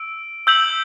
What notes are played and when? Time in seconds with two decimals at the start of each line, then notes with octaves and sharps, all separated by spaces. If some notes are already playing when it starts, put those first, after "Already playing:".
Already playing: E6 D7
0.47 E6 G6 B6 F#7